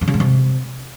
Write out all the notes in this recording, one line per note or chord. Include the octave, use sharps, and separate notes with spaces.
G2
C#3
G#2
C3